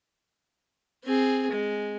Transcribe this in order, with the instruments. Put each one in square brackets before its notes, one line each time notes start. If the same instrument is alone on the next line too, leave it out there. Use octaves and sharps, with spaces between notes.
[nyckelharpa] C4 G#4
G#3